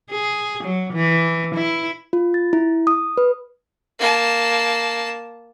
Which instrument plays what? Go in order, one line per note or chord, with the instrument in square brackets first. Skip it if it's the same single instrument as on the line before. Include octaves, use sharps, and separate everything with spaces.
[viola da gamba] G#4
F#3
E3
E4
[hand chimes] F4
A6
E4
D#6
B4
[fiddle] A#3 A5